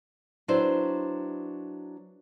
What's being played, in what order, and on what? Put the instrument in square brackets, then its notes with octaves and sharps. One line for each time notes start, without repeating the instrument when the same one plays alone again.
[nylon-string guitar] F#3 D4 E4 B4 C5